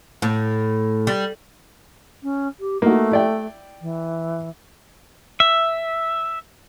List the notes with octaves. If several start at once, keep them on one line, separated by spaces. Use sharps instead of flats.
A2
G3
C#4
G4
A3 A#3 D#4 F#4
E4 D5 G5
E3
E5